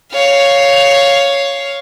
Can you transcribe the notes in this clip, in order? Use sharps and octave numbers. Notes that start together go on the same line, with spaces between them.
C#5 F5